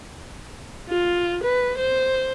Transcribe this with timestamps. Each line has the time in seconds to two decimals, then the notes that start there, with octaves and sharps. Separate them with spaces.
0.89 F4
1.44 B4
1.78 C5